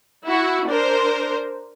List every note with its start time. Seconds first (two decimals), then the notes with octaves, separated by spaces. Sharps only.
0.24 E4 F#4
0.68 D4 A#4 C5